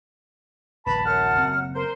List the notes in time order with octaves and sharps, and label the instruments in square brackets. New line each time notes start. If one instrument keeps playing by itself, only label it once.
[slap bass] A#1 D#2 [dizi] B4 [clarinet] A5 [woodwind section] B5
[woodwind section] F#2 F#5 [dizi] F6
[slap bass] F#1 C4
[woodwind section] A#4 C5